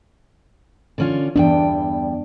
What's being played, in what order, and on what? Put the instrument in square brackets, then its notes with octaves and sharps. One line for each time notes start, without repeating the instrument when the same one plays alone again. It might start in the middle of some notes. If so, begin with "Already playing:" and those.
[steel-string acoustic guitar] D3 C#4 F4
[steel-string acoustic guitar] E2 G2 G5 [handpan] D4